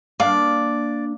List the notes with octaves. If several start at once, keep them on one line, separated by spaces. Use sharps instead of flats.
A#3 D4 D5 F5